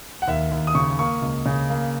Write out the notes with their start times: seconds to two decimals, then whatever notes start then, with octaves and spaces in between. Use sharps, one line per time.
0.22 F#5
0.28 D#2 E5
0.51 D#2
0.67 D#6
0.74 C#3 C#6
0.99 A#3 C#6
1.22 C#2
1.46 C#3
1.70 A#3